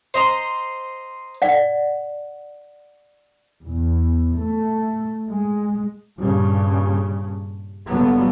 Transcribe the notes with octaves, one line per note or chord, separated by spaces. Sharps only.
C5 D#5 A#5 C6
D5 F#5
E2
A3
G#3
G2 A#2 C#3
G#1 D3 F#3 G3 A#3 B3